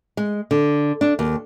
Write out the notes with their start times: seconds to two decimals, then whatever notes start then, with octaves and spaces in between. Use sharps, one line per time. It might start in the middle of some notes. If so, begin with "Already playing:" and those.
0.17 G#3
0.51 D3
1.01 D4
1.19 D#2